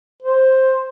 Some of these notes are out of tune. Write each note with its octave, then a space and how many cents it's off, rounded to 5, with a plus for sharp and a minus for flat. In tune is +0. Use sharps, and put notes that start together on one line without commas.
C5 +5